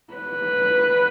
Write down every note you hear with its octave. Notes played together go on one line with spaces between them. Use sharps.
B4